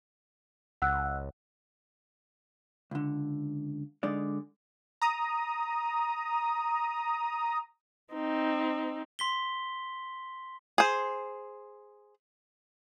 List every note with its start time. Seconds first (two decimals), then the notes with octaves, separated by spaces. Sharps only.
0.82 C#2 F#5 E6 F#6
2.91 C#2 D3
4.03 D3 G#3 D#4 D5
5.02 A#5 D#6
8.14 C4 D#4
9.19 C6 B6 G7
10.78 G#4 C5